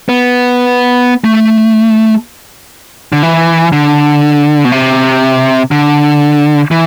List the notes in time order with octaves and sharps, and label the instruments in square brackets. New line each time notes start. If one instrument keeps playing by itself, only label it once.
[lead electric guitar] B3
A3
D3
E3
D3
B2
C3
D3
E3